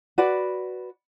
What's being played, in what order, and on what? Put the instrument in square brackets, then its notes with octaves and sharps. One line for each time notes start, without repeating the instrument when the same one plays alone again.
[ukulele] F#4 B4 D5 B5